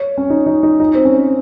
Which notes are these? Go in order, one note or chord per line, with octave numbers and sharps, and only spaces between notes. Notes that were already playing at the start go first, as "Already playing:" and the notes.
Already playing: C#5
C#4
D#4
D#4
D#4
D#4
C4
C#4